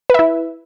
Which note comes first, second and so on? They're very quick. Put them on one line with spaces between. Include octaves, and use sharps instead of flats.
B4 E5 E4